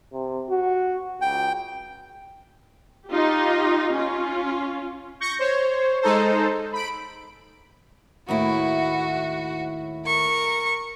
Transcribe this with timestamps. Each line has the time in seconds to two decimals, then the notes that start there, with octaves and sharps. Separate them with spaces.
0.12 C3
0.49 F#4
1.21 C#2 G5
3.09 D#4 F4 G4
3.93 C#4 F4
5.20 C#6 G6 A#6 C#7
5.39 C5 C#5
6.02 G#3 D#4 A4 C5
6.73 B5 D7
8.28 D#2 A2 E4 F#4
10.05 A#4 C#6